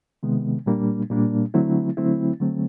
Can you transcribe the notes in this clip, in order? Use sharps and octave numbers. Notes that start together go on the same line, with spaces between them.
C3 D#3 G#3 B3
A#2 G3 A#3 D4
A#2 G3 A#3 D4
D3 F#3 A3 C4 E4
D3 F#3 A3 C4 E4
D3 F#3 A3 C4